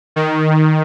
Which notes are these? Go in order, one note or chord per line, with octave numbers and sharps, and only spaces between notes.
D#3